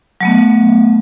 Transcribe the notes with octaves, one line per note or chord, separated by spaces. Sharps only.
F#3 A3 B3